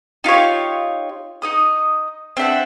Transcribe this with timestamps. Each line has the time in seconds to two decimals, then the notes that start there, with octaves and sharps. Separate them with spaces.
0.24 D#4 F4 G4 C#5
1.42 D#4 D#5 D#6
2.37 C4 D4 E5 F#5